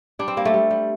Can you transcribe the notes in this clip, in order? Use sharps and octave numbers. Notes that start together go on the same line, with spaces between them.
G3 D4
C4
G3 A#3
A3
G3
G3